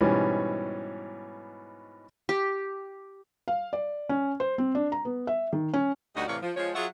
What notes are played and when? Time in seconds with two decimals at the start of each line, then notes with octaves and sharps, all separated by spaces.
0.01 G#2 B2 E3 G3 C#4
2.29 G4
3.48 F5
3.73 D5
4.09 C#4
4.40 C5
4.58 C4
4.75 D4
4.92 A#5
5.05 B3
5.27 E5
5.53 D#3
5.74 C#4
6.15 D2 G3 D#4 F#4 D#5
6.28 A2 C3 E3 C#5 D5 F5
6.42 F3
6.56 F3 G#3 C#5
6.75 F#3 F4 G#4 C#5 E5 F#5